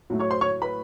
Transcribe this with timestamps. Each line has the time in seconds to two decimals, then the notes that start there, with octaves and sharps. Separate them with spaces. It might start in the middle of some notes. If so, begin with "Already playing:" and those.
0.10 A2 F#3 A3
0.19 C#5 C#6
0.30 C5 C6
0.41 C#5 C#6
0.62 B4 B5